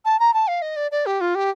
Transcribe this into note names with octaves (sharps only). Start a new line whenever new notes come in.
A5
A#5
A5
F5
D#5
D5
D5
G4
F4
G4